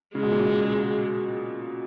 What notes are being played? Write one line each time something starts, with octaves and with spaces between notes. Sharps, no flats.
C#3 G#3
B2
A#2
B2